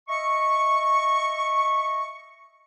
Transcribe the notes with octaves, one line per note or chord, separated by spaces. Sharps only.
D#5 E5 C#6